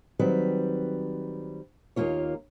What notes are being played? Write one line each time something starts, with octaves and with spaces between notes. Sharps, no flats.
D#3 F#3 G3 C4 B4
D#2 A#2 A#3 F4 C#5